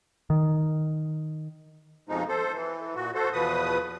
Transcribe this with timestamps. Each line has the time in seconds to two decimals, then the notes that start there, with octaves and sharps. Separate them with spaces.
0.30 D#3
2.09 F2 B2 F3 G#3 D#4
2.29 A4 C5
2.53 E3
2.96 A#2 F#4
3.15 F#4 A4 C5
3.33 E2 B2 F3 B4 D#6